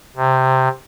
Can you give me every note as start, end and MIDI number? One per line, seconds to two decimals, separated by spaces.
0.16 0.68 48